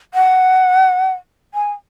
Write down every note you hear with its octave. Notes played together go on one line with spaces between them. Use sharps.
F#5
G#5